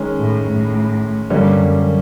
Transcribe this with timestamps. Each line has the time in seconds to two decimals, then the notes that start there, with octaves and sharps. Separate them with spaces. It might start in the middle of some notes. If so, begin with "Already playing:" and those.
Already playing: D#3 G#3 C#4
0.18 A2
0.46 A2
1.30 G2 D3 G3 A#3 C#4
1.59 F#2